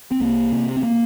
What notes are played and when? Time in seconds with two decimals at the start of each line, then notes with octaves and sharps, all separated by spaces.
0.12 C4
0.20 C2 A#3
0.52 C3
0.77 C4
0.83 A#3